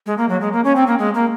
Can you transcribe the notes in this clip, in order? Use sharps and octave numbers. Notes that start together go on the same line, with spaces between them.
G#3
A#3
F#3
G#3
A#3
C#4
C4
A#3
G#3
A#3